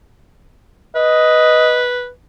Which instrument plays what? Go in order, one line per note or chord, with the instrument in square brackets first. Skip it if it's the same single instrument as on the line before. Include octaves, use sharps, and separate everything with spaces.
[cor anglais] B4 [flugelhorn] D#5